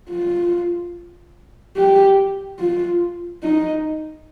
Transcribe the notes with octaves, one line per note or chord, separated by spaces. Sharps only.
F4
G4
F4
D#4